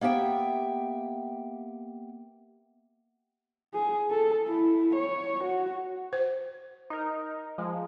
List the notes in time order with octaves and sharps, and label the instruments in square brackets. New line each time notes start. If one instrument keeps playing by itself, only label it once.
[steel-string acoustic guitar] A#3 B3 G4 E5 G5
[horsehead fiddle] G#4
A4
E4
C#5
F#4
[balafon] C5
[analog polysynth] D#4 A#4
F3 G#3